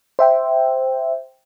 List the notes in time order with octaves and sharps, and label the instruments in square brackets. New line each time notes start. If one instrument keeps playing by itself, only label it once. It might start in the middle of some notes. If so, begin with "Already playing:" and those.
[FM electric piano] C5 E5 G5